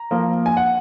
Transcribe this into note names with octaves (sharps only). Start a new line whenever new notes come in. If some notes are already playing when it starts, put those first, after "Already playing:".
Already playing: A#5
F3 A#3
G#5
F#5